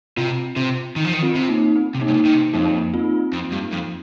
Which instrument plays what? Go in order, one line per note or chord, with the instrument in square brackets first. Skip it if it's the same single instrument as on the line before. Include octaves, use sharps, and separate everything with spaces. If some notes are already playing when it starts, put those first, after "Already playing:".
[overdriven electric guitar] C3 [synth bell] C4 F4
[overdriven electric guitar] C3
D#3
F3
D#3
[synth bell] C4 F4
[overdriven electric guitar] C3
[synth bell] A#3 D#4
C4
[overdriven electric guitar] C3
[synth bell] A#3 D#4
[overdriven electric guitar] G2
A#2
D#3
C3
[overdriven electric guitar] F2 [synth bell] A#3 D#4
[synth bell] C4 F4
[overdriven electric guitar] F2
G2
F2